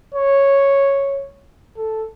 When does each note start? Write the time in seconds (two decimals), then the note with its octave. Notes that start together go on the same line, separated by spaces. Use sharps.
0.14 C#5
1.77 A4